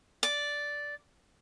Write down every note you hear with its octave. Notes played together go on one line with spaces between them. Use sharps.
D5